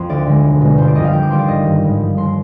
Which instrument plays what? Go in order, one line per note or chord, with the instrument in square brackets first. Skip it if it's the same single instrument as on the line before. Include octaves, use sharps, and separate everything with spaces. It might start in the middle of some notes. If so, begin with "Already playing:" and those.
Already playing: [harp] F2 C6
D2 D5
D3 G#3
B1
B2 G#3
G1 C5
D5
F2 D3 G3 D#5
F5
F2 G5
D6
D#3 G3 C6
D5
G1 D#5
G2 D#3 G3
G#1
G2 F3
D#2 C6